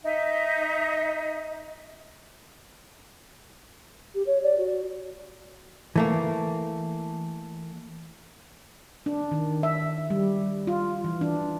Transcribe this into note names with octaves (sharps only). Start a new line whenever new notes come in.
D#4 D#5 E5
G4
C#5
D5
F#4
E3 A3 A#3
D4
D#3
E5
G3
F4
E3
D4